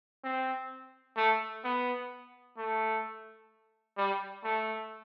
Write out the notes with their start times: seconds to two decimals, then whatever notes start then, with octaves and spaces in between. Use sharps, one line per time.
0.24 C4
1.17 A3
1.64 B3
2.57 A3
3.97 G3
4.44 A3